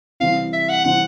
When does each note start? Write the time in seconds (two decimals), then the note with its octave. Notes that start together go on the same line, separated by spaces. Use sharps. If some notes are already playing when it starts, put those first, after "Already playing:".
0.20 C3 E3 G3 C4 E4 F5
0.53 E5
0.69 F#5
0.84 C3 E3 G3 C4 E4 F#5